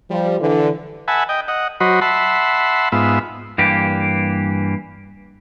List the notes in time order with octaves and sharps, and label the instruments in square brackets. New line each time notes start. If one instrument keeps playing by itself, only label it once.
[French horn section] F3 G3
D3 E3
[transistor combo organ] E5 F#5 G#5 A5 B5
D#5 G5
D#5 F#5
F#3 F#4 C5 D#5 B5
E5 F#5 A5 B5 C6
G#2 B3 F4 E5
[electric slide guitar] G2 E3 A#3 G4